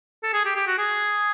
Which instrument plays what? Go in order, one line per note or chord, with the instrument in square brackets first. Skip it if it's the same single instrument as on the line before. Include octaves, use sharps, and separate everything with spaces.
[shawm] A4
G#4
G4
G4
F#4
G#4